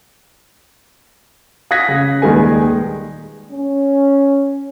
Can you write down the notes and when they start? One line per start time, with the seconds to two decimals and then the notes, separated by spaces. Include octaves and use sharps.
1.71 F5 D#6 F#6 G#6 A#6 B6
1.88 C#3
2.22 D#1 D#3 G#3 G#4 B4 G#5
3.52 C#4